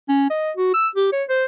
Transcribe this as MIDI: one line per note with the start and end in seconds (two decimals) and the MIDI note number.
0.09 0.27 61
0.30 0.51 75
0.57 0.70 66
0.74 0.88 88
0.96 1.09 67
1.13 1.23 73
1.29 1.46 72